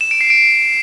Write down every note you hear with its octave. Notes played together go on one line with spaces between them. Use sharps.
E7
D7
C7
D7